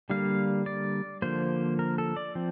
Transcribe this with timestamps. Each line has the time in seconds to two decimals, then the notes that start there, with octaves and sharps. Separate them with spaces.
0.10 D3 G3 A#3 F5
0.66 D5
1.22 D3 F3 A#3 C5
1.79 A#4
1.98 A4
2.16 D5
2.35 F3 C4